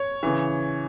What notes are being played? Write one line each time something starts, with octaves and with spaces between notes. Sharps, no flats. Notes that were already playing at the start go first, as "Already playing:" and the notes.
Already playing: C#5
C#3 E3